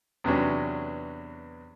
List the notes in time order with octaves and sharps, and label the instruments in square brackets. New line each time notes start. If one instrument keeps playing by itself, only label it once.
[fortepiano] E2 C3 F#3 B3 C#4 D4